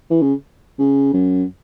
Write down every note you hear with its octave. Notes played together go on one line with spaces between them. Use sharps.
E3
C#3
C#3
F#2